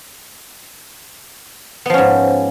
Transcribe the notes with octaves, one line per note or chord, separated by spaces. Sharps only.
G#2 F3 B3 C#4